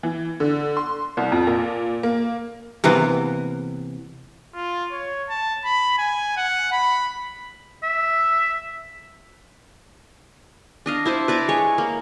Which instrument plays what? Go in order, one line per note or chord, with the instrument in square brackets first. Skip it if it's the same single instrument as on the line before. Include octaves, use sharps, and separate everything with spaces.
[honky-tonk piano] E3
D3
C6
C2
F2
A#2
A#3
[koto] C3 E3 A#3 B3
[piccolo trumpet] F4
C#5
A5
B5
G#5
F#5
B5
[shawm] E5
[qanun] D4 D#5 F5
E4 C5 A5 B5
B4 D5 E5 A#5
G#3 C#5
A#3